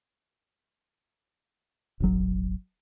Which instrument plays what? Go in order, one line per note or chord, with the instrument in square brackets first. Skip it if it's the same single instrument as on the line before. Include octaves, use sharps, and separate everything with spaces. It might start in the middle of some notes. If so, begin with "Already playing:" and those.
[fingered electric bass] D#1 G#1 F#3